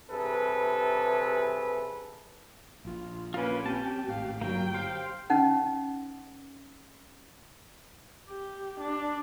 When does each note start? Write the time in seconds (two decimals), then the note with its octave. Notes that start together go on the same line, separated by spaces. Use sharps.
0.11 G2 C3 E3 G#4 A4 B4
2.85 A#1 F4
3.34 A#3 C#4 F4 B4
3.66 C4 G4 G5 A5
4.08 G#1 A2 F5
4.41 G1 F#3 A#3 G5
4.74 G4 C5 F5
5.30 C#4 D#4 F#5
8.29 G4
8.80 D4